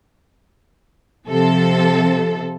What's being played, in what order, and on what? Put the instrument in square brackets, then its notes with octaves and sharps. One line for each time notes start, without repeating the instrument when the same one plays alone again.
[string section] C3 F3 A4